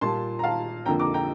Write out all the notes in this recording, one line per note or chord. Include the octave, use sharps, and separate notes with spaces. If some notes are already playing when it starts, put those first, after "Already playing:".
A#2 G3 A#3 A5 C6
A#5
F5 A5
F2 D3 F3 A#3 G5 A#5
A#5 D6
G5 A#5